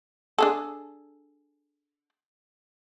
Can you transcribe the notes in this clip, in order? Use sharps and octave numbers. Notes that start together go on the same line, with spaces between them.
D4 G#4 A4